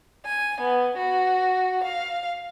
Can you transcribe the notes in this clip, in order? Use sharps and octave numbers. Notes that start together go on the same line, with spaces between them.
G#5
B3
F#4
F5